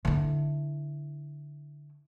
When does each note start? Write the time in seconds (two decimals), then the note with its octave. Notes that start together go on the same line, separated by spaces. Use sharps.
0.05 D3 E4